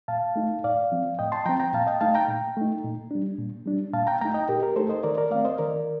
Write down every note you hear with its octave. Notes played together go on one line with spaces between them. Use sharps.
A#2 F5 A5
A3 D#4
A2 D5 F5
F3 C4
A2 D#5 G5
A5 C6
F3 C4 G5 A#5
G5 A#5
A#2 F5 A5
D#5 G5
A3 D#4 F5 A5
G5 A#5
A#2
A3 D#4
A#2
G3 D4
A#2
G3 D4
A#2 F5 A5
G5 A#5
A3 D#4 G5 A#5
D#5 G5
A#2 G4 A#4
G4 A#4
A3 D#4 A4 C5
C5 D#5
D#3 A#4 D5
A#4 D5
A3 C4 D5 F5
C5 D#5
D#3 A#4 D5